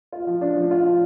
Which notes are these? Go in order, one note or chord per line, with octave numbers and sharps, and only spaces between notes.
F4
F3
D4
F3
F4
F3